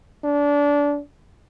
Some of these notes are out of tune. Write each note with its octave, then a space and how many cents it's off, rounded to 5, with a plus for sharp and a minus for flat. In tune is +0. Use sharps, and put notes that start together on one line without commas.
D4 -25